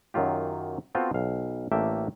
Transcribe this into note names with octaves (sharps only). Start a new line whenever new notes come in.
F#2 D#3 F#3 F4 G4
B3 C4 F4 F#4 A4 C5
B1 F5
A1 A3 A#3 D4 E5 G5